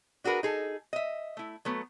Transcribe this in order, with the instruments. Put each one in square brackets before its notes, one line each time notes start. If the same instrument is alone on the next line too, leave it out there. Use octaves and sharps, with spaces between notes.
[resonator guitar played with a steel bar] D4 F#4 G#4 A#4 B4
D#4 G#4 A4
D#5 E5
A3 E4
F#3 A3 B3